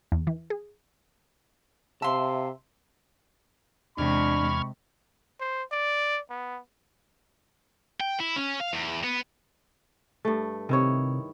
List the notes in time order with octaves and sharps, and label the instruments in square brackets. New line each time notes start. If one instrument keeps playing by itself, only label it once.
[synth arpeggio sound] E2
E3
G#4
[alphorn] C3 [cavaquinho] E5 C6 [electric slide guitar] F5 A5
[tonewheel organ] E2 F6 G#6 [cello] C3 G#3 [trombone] D4 [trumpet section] B5 C#6
[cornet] C5
D5
B3
[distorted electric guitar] G5
E4
C#4
F5
E2
B3
[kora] G2 A3
[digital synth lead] C3 [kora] D#3 E4 C#5